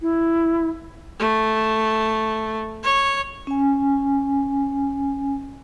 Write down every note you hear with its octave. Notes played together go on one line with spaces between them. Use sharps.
E4
A3
C#5
C#4 G#5